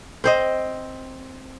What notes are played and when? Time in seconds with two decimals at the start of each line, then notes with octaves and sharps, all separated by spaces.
0.24 C4 C5 D#5